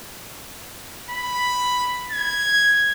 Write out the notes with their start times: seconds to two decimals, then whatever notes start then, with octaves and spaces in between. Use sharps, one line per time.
1.10 B5
2.11 G#6